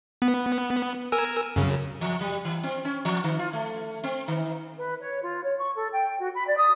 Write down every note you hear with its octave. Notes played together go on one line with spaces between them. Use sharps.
B3
A#4 G#5 E6
F#2 C#3
F3
G3
E3
C4
C#4
F3
D#3
F4
A3
C4
D#3
B4
C#5
F4
C#5
C#6
A4
G5
F#4
B5
D5
D#6